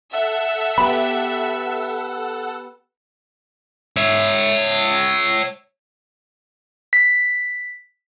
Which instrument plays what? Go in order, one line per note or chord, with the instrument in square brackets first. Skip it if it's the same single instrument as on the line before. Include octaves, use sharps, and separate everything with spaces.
[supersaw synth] A4 F#5 E6 [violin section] E5
[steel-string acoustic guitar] B3 G4 B4 [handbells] B5
[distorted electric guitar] C#5 E5
[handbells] B6